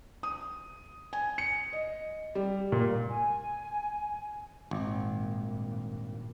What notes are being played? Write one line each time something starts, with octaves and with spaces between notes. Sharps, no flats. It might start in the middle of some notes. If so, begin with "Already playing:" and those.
D#6
G#5
C#7
D#5
G3
A#2
G#5
G#1 G2 A#2